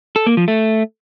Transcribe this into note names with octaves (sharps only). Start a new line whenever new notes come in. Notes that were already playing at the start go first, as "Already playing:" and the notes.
A4
A#3
F3
A3